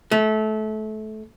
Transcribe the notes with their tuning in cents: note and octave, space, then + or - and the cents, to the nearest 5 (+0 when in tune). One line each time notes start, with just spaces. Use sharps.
A3 -25